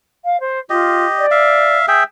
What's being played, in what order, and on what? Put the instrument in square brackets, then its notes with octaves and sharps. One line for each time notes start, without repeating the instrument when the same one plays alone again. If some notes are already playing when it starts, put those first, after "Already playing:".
[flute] F5
C5
[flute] F4 [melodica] G4 D#5
[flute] D5
[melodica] E5 F5
G#4 E5 G5